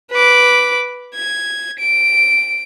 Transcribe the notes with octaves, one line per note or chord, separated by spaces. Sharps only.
B4 D6
G#6
D7